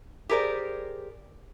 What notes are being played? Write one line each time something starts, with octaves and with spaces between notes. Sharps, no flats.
G4 G#4 A#4 C5 D5